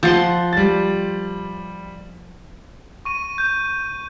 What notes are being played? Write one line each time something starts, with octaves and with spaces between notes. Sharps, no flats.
F3 F#5 C6 G6 A6 C7
G3 A6
C#6 D#7
G6